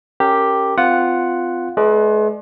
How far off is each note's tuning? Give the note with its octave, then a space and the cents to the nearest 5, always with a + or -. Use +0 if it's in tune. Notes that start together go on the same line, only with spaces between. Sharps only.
C#4 +0 G4 +0 A#4 -20
C4 -30 F4 +0 F#5 +0
G#3 +45 B4 +0 D5 +35